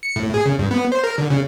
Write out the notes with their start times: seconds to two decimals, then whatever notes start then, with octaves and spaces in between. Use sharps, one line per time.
0.03 C#7
0.16 A2
0.34 G#4
0.46 C#3
0.59 G2
0.71 B3
0.92 C5
1.04 A#4
1.18 D3
1.30 C#3